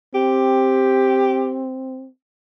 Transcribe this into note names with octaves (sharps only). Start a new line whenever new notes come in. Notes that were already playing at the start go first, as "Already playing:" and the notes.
C4 G4